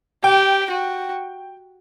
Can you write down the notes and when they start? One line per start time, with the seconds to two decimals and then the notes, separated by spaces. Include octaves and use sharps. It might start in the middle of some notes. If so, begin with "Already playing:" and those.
0.24 G4 G5
0.70 F#4